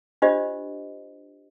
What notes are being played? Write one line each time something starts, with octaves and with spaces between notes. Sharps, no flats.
D4 F4 G4 C5 D#5